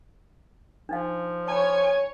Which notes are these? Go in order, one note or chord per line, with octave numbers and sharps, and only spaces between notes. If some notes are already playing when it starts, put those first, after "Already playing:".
F3 D4 D#4 F5
C#5 G#5 A5 B5